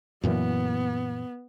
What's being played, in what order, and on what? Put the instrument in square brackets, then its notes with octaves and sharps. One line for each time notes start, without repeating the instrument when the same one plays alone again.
[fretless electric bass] F#2 A#2 E3 [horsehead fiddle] B3